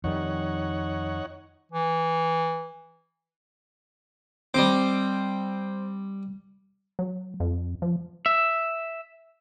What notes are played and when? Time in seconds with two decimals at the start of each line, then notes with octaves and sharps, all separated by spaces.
0.04 F2 D#3 G3 D#4 C#5 F#5
1.72 E3
4.54 G3 C4 D#5 D6
6.99 F#3
7.40 F2
7.82 F3
8.26 E5